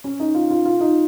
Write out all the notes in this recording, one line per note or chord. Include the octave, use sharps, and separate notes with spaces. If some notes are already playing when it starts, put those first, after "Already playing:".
C#4
D#4
F4
F4
F4
D#4